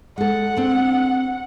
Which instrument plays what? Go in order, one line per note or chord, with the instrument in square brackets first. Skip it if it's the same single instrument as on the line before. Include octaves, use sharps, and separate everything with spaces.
[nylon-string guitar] G#3 A4 [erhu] F#5
[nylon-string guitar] C4 D4